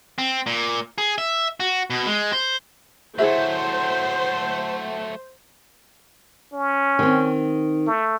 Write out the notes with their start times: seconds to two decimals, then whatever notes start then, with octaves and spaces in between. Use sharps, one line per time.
0.18 C4
0.46 A#2
0.98 G#4
1.18 E5
1.60 F#4
1.90 B2
2.06 G#3
2.33 C5
3.18 F#3 A3 E4 G#4 C5 E5 F#5
6.53 C#4
6.99 D#3 C4
7.87 A3